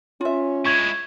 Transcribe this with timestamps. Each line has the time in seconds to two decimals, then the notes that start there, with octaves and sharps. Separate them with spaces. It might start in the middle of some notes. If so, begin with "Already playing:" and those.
0.21 C#4 F4 E5
0.66 G#3 E4 C#6 G#6